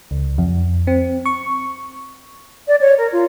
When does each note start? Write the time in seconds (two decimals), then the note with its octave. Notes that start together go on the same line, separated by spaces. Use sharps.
0.11 C#2
0.38 F2
0.87 C4
1.26 C#6
2.67 D5
2.81 C#5
2.97 A#4
3.12 F4